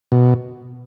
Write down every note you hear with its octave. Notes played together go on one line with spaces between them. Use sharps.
B2